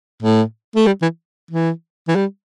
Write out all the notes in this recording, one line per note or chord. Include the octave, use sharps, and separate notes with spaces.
A2
A3
G3
E3
E3
E3
G3